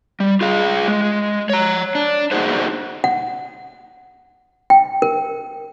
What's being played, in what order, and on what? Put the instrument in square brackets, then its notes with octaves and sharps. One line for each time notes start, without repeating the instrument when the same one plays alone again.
[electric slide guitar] G3
F4 G#4 F5
G#3
C#5 A#5
D4
A#3 D4 D#4 F#4 G#4 C5
[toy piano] F#5
G5
A#4